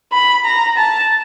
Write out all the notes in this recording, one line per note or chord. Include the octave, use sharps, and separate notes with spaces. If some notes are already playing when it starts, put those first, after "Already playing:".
B5
A#5
A5